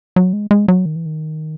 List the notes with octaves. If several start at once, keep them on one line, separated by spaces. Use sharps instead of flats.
F#3
G#3
G#3
F#3
D#3
E3
D#3